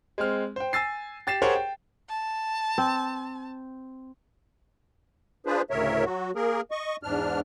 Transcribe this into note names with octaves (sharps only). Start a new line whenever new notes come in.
G#3 C4 F6
C5 G5
G#5 E6 A6 C7
G4 A6 C7 E7
G4 G#4 A#4 C5 C#5 F#5
G5
A5
C4
D4 F4 G#4 B4 C5
D2 A2 C#3 A#4 C#5 E5
F#3 F#4
A#3 G#4 A#4
D#5 C#6
E2 G#2 D4 F6